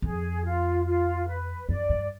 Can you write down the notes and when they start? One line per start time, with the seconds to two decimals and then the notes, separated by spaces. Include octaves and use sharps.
0.02 F2 G#4
0.44 F4
0.86 F4
1.28 B4
1.69 F#2 D5
1.89 G2